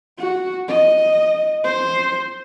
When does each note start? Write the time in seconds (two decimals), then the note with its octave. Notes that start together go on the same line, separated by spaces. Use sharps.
0.18 F#4
0.68 D#5
1.64 C5